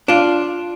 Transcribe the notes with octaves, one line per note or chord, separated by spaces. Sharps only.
D4 F4